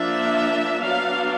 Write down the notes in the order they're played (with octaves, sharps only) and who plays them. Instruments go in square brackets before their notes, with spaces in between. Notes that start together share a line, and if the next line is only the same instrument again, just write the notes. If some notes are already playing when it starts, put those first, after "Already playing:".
Already playing: [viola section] F3 A#3 D4 E5
F#3 B3 D4 F5